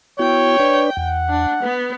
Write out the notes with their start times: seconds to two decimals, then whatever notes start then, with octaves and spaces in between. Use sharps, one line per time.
0.19 B3 E4 F#4 C#5 G5
0.59 D4 B4 D5
0.97 E2 F#5
1.29 D4
1.62 B3 B4